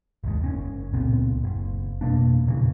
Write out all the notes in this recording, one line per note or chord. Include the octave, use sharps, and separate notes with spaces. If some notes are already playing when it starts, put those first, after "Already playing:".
G#1 D#2 G#2
F#1 C4 C#4
C#2 A#2 B3 C4
F#1
F2 B2 A#3 D4
E2 A#2 C#3 E3